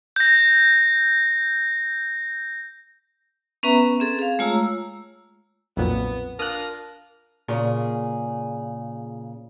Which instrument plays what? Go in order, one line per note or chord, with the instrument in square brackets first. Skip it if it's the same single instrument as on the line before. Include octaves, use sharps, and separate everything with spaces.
[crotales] G6 A#6
[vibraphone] B3 C#4 B4 E5 A#5
C4 G#4 A4
G#4 F5
G#3 A3 F4 C#5 A#5 E6
[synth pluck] B1 F2 A#2 [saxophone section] B3
[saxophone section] D4 F4 A#4 [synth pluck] D#6 F#6
[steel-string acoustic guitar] A#2 C#3 G#4